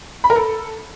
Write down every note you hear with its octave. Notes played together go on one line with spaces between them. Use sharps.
B5
A#4
A4